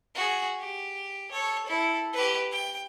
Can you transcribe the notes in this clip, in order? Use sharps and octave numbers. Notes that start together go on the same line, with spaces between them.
F#4 G#4
G4
A4 C#5
E4 A4
G4 B4
G5